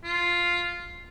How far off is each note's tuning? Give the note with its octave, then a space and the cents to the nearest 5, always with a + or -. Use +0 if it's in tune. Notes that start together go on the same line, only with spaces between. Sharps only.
F4 +0